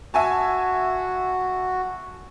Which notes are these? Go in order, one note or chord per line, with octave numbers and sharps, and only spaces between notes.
F#4 E5 G#5 A5